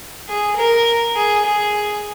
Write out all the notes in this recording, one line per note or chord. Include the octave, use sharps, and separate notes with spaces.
G#4
A#4
G#4
G#4